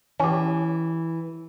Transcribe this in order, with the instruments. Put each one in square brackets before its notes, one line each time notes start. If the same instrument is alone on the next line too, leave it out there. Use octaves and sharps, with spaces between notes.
[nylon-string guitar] E3 [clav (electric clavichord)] C#4 G4